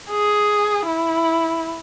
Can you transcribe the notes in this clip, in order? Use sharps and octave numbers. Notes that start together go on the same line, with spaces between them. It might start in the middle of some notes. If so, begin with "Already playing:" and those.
G#4
E4